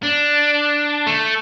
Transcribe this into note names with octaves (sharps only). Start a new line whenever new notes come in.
D4
A3